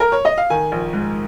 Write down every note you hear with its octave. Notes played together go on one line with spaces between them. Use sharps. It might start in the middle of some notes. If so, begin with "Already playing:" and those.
A#4
C#5
D#5
F5
D#3 G#5
A#1
G#2